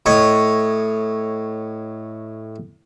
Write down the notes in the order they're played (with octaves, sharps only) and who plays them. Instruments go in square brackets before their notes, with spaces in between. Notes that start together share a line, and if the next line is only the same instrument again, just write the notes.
[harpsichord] A2 C#5 D#5